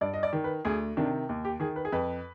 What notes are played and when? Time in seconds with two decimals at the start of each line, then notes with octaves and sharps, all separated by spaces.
0.01 G2 D5
0.14 D#5
0.23 D5
0.33 D#3
0.44 B4
0.65 D2 G#4
0.97 C3 D#3 D4
1.29 D#2
1.45 G4
1.60 D#3 G#4
1.76 B4
1.85 G#4
1.92 F2 B4